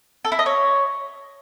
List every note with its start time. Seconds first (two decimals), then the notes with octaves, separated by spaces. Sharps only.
0.25 A4
0.32 E4
0.39 D#5
0.46 C#5